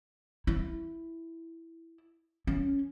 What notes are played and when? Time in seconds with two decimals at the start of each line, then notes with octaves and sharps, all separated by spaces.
0.47 E4
2.47 C#4